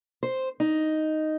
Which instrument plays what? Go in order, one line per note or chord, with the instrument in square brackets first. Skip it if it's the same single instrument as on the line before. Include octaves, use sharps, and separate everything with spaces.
[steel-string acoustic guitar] C5
D#4